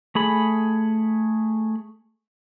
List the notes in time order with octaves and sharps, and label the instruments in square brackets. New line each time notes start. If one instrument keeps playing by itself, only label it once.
[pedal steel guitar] A3 G#4 B5